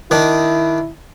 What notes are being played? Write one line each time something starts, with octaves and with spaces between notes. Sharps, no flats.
D#3 D4 E4